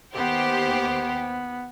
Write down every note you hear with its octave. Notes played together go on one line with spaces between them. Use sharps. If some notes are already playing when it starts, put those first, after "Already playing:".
D#2 B3 G4 C5